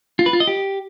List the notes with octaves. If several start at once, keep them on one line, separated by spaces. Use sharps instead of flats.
F4
B4
F4
D#5
G4